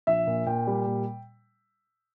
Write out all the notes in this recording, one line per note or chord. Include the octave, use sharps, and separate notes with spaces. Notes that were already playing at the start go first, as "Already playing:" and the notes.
A#1 E5
A#2
A#2 G5
G3
A#2